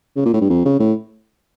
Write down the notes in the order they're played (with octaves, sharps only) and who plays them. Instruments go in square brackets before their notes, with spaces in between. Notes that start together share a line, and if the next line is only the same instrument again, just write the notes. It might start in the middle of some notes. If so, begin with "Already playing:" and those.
[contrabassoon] C#3
A#2
A2
G2
F2
C#3
A2